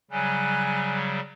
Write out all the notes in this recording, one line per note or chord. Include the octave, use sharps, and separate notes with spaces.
C#3 F#3 G3 G#5 F#6